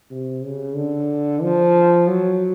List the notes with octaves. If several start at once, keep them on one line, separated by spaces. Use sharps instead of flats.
C3
C#3
D3
F3
F#3